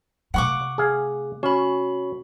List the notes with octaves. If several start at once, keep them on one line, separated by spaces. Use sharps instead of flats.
C3 A3 F5 F#5 C#6 D6
G#4 F5
C#4 F#4 B5